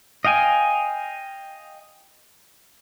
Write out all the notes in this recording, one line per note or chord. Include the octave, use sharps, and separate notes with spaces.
D#5 F5 G5 G#5